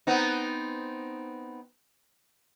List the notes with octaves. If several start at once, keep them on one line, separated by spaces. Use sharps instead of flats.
B3 C4 D#4